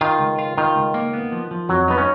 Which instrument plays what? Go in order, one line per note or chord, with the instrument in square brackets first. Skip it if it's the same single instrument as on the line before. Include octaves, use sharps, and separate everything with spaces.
[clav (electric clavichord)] D#3 [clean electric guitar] F4
[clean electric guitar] C#2
F4
[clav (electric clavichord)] D#3 [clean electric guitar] F4
[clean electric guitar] C#2
A#3
B3
F3
F3
[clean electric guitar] F2 [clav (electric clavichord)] F#3
[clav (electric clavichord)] B3 [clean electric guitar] D#4
[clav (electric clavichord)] C#4